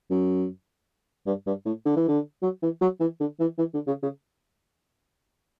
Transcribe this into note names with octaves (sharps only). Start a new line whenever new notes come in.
F#2
G2
G2
A2
D3
E3
D3
F#3
E3
F#3
E3
D3
E3
E3
D3
C#3
C#3